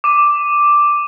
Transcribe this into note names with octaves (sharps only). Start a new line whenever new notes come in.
D6 D#7